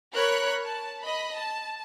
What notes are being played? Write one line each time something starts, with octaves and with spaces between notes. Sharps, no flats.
A#4 C#5 B5 F#6
A5
D#5 B5
A5